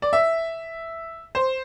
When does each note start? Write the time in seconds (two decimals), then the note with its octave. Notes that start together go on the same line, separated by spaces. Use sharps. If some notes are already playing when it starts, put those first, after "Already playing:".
0.02 D5
0.13 E5
1.35 C5